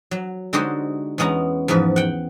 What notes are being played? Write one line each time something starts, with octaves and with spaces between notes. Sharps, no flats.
F#3
D3 G#3 D#4 F#4 G4 C5
E2 G#3 B3 C#4 A#5
E2 G#2 F3 B4
F#5 G5